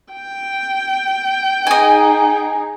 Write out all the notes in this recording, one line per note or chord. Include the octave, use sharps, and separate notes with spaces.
G5
D#4 G#4 D#5 G#5